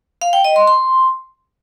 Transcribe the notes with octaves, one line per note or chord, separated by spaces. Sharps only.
F5
G5
D#5
C6
C6